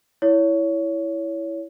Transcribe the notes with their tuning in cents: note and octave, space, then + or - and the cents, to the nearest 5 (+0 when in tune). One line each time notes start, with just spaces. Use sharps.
E4 +0 C#5 +20